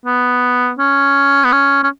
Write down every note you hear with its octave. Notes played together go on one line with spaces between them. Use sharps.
B3
C#4
B3
C#4
C#4